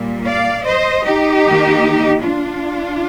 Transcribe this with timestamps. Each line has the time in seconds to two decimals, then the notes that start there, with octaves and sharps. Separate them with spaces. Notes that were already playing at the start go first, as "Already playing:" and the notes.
Already playing: A#2 G3 A#3
0.25 D5 F5
0.65 C5 D#5
1.04 D#4 G4
1.43 D#3 A#3
2.22 D4 F4